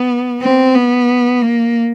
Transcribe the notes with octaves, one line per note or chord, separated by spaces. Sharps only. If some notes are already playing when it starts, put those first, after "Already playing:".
Already playing: B3
C4
B3
A#3